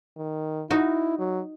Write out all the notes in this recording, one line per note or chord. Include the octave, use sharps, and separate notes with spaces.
D#3
D#4 E4 F#4
F#3